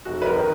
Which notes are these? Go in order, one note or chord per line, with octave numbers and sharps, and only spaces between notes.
F1 F#4
B4
A#4
D#3